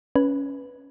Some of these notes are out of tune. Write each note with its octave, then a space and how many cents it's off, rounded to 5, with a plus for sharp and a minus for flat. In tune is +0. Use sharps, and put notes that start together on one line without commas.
C#4 +10 B4 +0